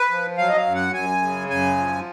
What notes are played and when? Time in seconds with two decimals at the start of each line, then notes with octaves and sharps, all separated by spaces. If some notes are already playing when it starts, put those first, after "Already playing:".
Already playing: B4
0.10 F3
0.38 F#3 F5
0.49 D#5
0.56 F5
0.65 F#2
0.75 F#5
0.93 F#2 G#5
1.22 C#3
1.49 F#2 G#5
1.77 F3